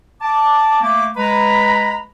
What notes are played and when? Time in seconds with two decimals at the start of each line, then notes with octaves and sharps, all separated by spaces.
0.21 A5 D6
0.81 A3 A#3 D6
1.16 G#3 B4 A#5 B5